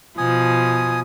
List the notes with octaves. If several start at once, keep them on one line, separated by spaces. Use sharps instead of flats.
B2 F3 G#5 D#6